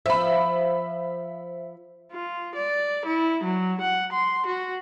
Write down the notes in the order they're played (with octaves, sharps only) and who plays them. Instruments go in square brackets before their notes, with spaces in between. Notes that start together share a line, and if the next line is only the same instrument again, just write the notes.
[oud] F3 [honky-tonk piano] E5 B5
[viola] F4
D5
E4
F#3
F#5
C6
F#4